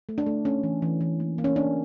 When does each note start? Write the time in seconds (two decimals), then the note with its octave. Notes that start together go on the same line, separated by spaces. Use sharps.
0.09 A3
0.18 D4
0.26 A3
0.45 A3 C#4
0.63 E3
0.82 E3
1.01 E3
1.20 A#3
1.38 A#3
1.44 C#4
1.56 A#3 D4